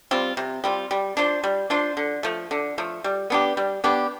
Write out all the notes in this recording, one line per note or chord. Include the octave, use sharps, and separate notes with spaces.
G3 C4 F4
C3
G3 C4 F4
G3
D4 F4 C5
G3
D4 F4 C5
D3
F3 A3
D3
F3 A3
G3
B3 D4 G4
G3
B3 D4 G4